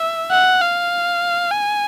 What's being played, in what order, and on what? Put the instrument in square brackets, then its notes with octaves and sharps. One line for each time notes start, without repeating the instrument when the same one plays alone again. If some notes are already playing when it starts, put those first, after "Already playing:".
Already playing: [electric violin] E5
F#5
F5
G#5